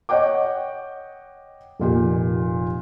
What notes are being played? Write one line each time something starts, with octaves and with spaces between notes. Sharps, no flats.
C#5 D#5 F#5 G5 D6
F1 A#2 G4